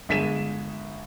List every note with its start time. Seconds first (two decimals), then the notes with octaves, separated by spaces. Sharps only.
0.09 G1 G#3 B6 D#7 E7